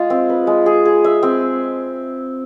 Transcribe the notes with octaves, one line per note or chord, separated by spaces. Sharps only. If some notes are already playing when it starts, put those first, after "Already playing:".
Already playing: G#3 F4 G#4
C4
B4
G#3
G#4
G#4
E5
C4